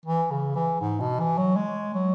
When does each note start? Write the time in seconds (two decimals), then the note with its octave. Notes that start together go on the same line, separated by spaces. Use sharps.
0.06 E3
0.31 C#3
0.56 E3
0.81 G#2
1.00 B2
1.19 E3
1.38 F#3
1.56 G#3
1.94 F#3